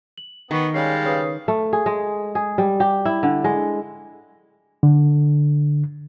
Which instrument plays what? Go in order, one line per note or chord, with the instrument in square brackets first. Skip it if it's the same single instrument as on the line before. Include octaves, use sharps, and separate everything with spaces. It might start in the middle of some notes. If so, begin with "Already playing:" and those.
[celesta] F#7
[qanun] D#3 [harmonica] B3 [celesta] G5 C#6 B6
[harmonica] G3 G#3 F5 [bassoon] C#4 [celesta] C7
[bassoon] C#3 [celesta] B4 D#6 C7
[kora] A3
G#4
G#3
G#4
G3
G4
E4
D3
G#3
[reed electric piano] D3